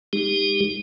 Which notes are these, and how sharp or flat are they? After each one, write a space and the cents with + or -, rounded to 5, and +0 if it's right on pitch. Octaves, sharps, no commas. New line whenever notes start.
G#3 -20 D#4 +0 G4 +15